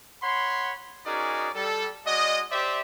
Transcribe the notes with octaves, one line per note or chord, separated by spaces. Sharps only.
C#5 F#5 B5 C6
C#4 D#4 F#4 G#4 A#4 D5
G3 A4
G#3 F#4 D5 D#5
G4 C5 D5 E5